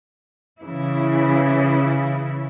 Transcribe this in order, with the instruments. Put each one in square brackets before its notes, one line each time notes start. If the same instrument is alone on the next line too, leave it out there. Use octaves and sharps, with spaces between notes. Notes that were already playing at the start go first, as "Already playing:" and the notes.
[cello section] C#3 E3 E4